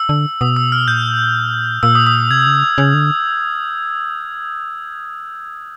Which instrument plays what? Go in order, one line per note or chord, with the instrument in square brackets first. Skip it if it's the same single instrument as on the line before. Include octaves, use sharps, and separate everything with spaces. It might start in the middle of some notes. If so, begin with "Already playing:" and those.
Already playing: [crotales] E6
[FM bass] D3
[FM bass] B2 [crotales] D#6
[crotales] E6
F6
[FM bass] A#2 [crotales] G6
[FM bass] A#2 [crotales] E6
[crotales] D#6
D#6
[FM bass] C3 [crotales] G#6
[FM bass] C#3
C#3
D3